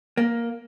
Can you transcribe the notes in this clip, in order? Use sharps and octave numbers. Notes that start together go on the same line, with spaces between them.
A#3